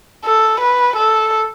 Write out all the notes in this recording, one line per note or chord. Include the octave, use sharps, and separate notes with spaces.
A4
B4
A4